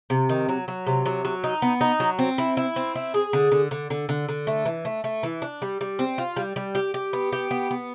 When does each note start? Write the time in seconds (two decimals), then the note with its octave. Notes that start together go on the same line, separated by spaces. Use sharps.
0.10 C3
0.29 D#3
0.49 F#3
0.68 F#3
0.87 C3
1.06 F#3
1.25 F#3
1.44 D#4
1.62 B3
1.81 D#4
2.00 F#3
2.19 C4
2.38 E4
2.57 E4
2.76 C4
2.95 E4
3.14 G#4
3.33 D3
3.52 D3
3.71 D3
3.90 D3
4.09 D3
4.29 D3
4.47 A3
4.66 E3
4.85 A3
5.04 A3
5.23 E3
5.42 D4
5.62 G3
5.81 G3
5.99 C4
6.18 F4
6.36 G3
6.56 G3
6.75 G4
6.94 G4
7.13 B3
7.32 G4
7.51 B3
7.71 B3